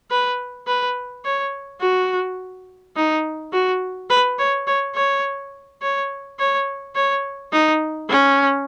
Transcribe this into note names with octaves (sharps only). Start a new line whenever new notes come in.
B4
B4
C#5
F#4
D#4
F#4
B4
C#5
C#5
C#5
C#5
C#5
C#5
D#4
C#4